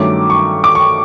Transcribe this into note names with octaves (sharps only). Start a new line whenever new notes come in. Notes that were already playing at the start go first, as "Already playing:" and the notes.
Already playing: G2 D#3 F#3 A3 C#4 D6
C#6
D6
C#6